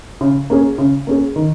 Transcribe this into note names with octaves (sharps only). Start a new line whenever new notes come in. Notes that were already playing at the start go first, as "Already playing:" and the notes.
C#3
A#3 C#4 G#4
C#3
A#3 C#4 G#4
D#3